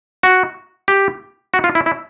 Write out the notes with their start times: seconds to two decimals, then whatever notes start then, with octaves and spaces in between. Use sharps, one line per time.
0.23 F#4
0.88 G4
1.54 F#4
1.64 F4
1.75 E4
1.86 E4